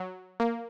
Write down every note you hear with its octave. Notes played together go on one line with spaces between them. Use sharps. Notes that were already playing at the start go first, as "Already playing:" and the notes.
Already playing: F#3
A#3